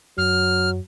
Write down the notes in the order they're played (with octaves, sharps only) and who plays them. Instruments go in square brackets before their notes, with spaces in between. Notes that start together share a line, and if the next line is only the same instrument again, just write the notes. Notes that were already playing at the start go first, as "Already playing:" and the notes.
[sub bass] F#2 [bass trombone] F#3 [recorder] F6